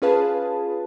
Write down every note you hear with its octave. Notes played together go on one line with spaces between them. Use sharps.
C#4 F4 G#4 B4 F5 A5